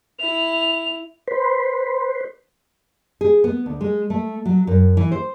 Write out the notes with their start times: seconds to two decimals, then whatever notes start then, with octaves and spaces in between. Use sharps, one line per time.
0.19 E4 F7
1.28 B4 C5
3.21 G#4
3.44 B3
3.66 D2
3.81 G#3
4.10 A3
4.45 F#3
4.67 F#2
4.97 E3
5.12 C5